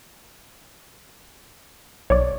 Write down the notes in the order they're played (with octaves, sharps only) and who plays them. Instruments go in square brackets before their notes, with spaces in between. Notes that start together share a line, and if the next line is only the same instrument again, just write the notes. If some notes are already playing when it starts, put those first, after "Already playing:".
[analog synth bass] B1 [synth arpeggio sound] C#5 D5